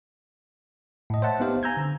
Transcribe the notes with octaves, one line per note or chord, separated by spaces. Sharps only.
A2 D#5
C5 C#5 E5 F#5 A5
B3 C4 D#4 G4 C5 F5
G#5 A#5 E6 G6 G#6
D3